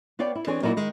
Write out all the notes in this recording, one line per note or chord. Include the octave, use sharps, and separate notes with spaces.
B3 B4 C#5 D5 F5 G5
E4
E3 C4 D4 G#4 C#5
A#2 F#3 A#3 D#4 E4 F#4
D#3 G#3